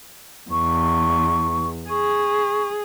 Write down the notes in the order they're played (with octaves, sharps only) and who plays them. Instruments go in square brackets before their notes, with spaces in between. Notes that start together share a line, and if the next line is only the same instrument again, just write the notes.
[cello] E2 [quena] C#6
[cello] G#4 [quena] C#6